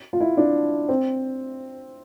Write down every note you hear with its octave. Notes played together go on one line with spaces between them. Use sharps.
F4
E4
D4
C4